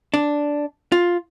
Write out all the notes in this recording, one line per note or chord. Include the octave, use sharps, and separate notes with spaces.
D4
F4